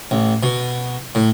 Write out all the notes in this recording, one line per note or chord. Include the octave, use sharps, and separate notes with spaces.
A1
B2
A2